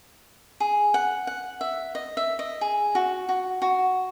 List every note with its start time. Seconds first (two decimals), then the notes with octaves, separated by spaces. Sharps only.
0.60 G#4
0.94 F#5
1.27 F#5
1.61 E5
1.95 D#5
2.17 E5
2.39 D#5
2.61 G#4
2.95 F#4
3.29 F#4
3.62 F#4